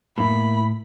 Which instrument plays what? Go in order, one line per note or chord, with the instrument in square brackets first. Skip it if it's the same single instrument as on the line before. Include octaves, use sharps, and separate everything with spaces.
[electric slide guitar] A2 [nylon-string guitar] A#3 E4 [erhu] B5